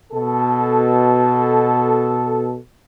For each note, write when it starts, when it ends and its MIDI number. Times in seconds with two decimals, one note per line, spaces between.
0.13 2.56 47
0.13 2.56 69